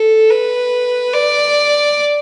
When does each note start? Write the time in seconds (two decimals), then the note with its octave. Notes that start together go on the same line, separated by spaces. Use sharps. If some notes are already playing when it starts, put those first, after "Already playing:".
Already playing: A4
0.31 B4
1.14 D5